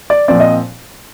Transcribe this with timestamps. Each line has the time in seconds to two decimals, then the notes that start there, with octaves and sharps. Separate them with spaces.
0.10 D5
0.28 A#2 F3 C4 D5
0.40 D#5